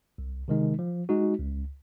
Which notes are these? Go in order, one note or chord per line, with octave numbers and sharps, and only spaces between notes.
C2
C3 D#3 G#3 D#4
F3
G#3 D#4 F#4
C#2